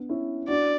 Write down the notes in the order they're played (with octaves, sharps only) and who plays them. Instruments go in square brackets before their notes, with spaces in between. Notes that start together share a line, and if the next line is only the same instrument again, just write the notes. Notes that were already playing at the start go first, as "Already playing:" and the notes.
Already playing: [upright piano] B3 D4
C#4 E4
[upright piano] D4 F#4 [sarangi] D5